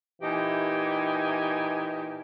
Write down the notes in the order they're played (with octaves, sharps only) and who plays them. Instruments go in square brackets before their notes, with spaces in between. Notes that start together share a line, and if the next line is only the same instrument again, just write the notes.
[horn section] A#2 E3 D#4 G4 G#5